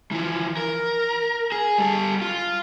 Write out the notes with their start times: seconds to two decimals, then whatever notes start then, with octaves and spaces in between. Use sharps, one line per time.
0.11 E3 F3
0.57 A#4
1.52 G#4
1.78 G3 A4
2.22 F4